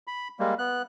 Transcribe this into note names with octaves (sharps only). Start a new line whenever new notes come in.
B5
G3 G#3 A#3
B3 F#6